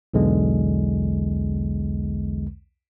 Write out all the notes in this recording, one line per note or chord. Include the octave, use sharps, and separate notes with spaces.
B1 E2 D3 G#3